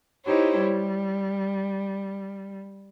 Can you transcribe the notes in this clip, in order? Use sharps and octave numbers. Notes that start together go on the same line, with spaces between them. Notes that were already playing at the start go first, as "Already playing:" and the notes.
D#4 E4 G4 C5 C#5
G3